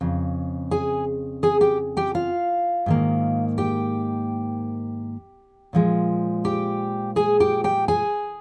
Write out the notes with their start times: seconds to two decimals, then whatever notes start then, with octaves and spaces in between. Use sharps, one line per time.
0.01 F2 C#3
0.71 G#4 G#5
1.43 G#4 G#5
1.61 G4 G5
1.97 G4 G5
2.15 F4 F5
2.86 G#2 D#3 A#3
3.58 G4 G5
5.73 A#2 F3 G#3
6.45 G4 G5
7.16 G#4 G#5
7.40 G4 G5
7.64 G4 G5
7.88 G#4 G#5